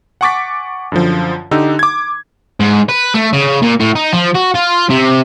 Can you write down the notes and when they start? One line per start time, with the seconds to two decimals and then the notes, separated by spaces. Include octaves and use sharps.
0.21 F#5 G#5 C#6 D6 A6 B6
0.92 F#2 D3 F3
1.51 D3 D#4 G4 E6
1.79 D6 G#6
2.60 G#2
2.89 B4
3.14 A3
3.33 C#3
3.62 A#2
3.80 A2
3.96 D#4
4.13 F3
4.35 F#4
4.54 F4
4.90 C3